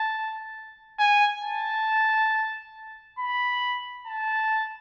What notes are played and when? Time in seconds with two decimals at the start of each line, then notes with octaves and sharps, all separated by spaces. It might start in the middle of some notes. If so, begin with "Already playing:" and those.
Already playing: A5
0.99 G#5
1.43 A5
3.19 B5
4.07 A5